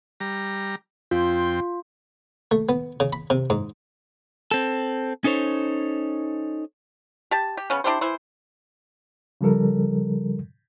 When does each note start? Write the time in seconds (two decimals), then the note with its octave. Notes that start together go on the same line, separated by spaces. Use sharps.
0.20 G3 A#5
1.11 F2 C4 F4 G5
2.51 A3
2.69 B3
3.00 C#3
3.13 B5
3.30 C3
3.50 G#2
4.51 C4 A4
5.24 C#4 D#4 A4 C5 C#5
7.31 G4 A5
7.57 G4
7.70 C#3 B3 C#4
7.84 D4 E4 G4 C5
8.01 E3 E4 C5
9.41 C#3 F3 G3 A4 A#4